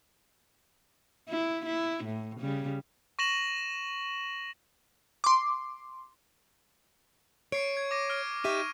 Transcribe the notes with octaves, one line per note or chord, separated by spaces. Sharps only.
E4
E4
A2
C#3 G3
C#6 A#6 E7 F#7
C6 D6
C#5 C#6 C7 D7
G#6
D6 A#6 D#7
F6 D7
D#4 G4 E5 C#6 D#7